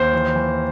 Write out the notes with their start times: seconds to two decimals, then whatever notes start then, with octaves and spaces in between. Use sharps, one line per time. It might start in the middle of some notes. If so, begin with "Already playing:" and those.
Already playing: D#2 C5
0.13 E3
0.35 E3